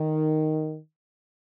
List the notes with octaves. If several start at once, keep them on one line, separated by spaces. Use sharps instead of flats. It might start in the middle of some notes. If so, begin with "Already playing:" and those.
Already playing: D#3